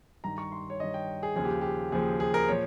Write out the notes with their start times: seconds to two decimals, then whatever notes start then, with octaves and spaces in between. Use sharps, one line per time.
0.24 G2 D#3 A#5
0.38 C#6
0.52 C6
0.70 C#5
0.80 G2 D#3 D#5
0.94 G5
1.23 G#4
1.36 D#2 C#3 F3 G#4
1.45 G4
1.61 G4
1.92 D#2 C#3 F3 G#4
2.20 G#4
2.34 A#4
2.48 A#2 F3 C#5